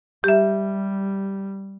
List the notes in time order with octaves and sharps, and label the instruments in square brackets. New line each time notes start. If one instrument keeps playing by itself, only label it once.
[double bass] G3 [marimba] G4 E5